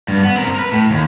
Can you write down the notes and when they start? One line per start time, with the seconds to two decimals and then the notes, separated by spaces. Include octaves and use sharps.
0.08 G2
0.22 B3
0.36 C4 A#4
0.55 A#4 B4
0.72 A2
0.90 D#2